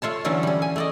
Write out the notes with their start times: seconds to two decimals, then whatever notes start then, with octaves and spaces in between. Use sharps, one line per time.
0.02 A3 F4 C#5 A5
0.25 D3 E3 F#3 A3 C#4
0.43 G3 C#4
0.62 G#5
0.76 A3 D5 D#5